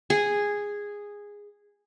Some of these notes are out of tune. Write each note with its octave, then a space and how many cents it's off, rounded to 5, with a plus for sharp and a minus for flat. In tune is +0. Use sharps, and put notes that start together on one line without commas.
G#4 -10